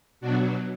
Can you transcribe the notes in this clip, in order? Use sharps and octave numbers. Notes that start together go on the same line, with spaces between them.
B2 F#3 D4 F#4